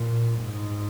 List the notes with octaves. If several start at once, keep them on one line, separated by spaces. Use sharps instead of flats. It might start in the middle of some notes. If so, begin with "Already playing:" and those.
Already playing: A#2
G#2